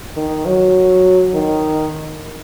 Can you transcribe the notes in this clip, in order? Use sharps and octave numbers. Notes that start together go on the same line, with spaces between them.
D#3
F#3
D#3